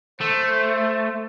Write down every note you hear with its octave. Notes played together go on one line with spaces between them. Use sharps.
A3 C5